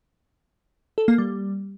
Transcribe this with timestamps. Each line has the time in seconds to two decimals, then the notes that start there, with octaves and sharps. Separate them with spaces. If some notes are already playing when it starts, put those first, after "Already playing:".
0.98 A4
1.08 A#3
1.18 G3